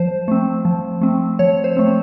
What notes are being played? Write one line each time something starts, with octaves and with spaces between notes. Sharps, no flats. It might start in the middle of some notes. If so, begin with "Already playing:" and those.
Already playing: F3 C5
A3 C4
F3
A3 C4
F3 C#5
C5
A3 C4